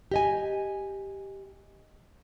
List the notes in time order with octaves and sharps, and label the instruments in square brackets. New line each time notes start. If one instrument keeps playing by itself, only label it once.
[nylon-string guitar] G4 D#5 G#5